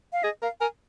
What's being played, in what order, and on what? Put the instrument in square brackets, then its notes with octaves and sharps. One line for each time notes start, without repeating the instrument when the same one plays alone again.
[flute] F5
[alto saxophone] G#4 [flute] D#5
[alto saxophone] A#4 [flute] F5
[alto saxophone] A#4 [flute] G#5